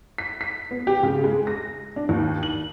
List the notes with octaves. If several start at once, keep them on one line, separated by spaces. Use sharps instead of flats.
B6
B6
B3
G4
C#3
G#3
A#6
D4
D#2
F#7